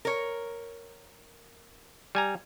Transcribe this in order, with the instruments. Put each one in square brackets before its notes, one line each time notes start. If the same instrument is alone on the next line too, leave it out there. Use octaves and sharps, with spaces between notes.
[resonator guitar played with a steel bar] A#4 C#5
[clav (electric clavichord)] G3 G#5 A#5